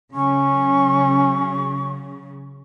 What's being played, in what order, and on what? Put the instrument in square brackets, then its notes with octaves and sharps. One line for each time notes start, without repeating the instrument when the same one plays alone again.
[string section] C#3 F#3 [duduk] C#4 [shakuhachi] C#6